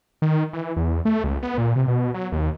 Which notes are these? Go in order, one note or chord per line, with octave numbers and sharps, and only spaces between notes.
D#3
E3
E2
A3
C#2
B3
A#2
C3
B2
F#3
D#2